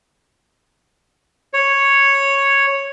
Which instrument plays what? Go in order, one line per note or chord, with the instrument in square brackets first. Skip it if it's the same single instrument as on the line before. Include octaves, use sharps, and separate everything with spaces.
[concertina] C#5